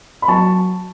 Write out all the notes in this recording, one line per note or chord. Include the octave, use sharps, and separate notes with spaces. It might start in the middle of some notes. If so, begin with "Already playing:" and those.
B5
F#3 A5 C#6